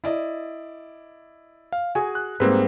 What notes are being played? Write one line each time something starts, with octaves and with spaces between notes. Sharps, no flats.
E4 D5 D#5
F5
F#4 G#4 G#5
F#6
G#2 G3 A#3 C4 B4